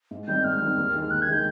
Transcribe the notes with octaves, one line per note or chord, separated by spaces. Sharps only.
G#2
D#3 G3 C4 D#4 G6
G#2 F6
D#3 G3 C4 D#4
D#2
D#3 G#3
D#2 F#6
G#6
D#3 G#3 G6